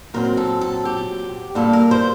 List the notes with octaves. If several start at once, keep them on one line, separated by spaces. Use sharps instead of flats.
A#2 F#3 C4 A#4
A4
A4
G4
A#2 G3 A#3 D4 A4
A#4
C5